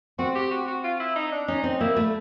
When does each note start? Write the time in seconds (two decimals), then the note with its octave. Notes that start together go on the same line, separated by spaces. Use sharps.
0.18 C4 F#4
0.35 G4
0.51 F#4
0.67 F#4
0.84 F4
1.00 E4
1.16 D#4
1.32 D4
1.48 C#4 D#4
1.64 C4
1.80 A#3 E4
1.97 A3